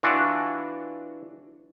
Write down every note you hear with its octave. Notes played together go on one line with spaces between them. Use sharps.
E3 D4 F4 F#4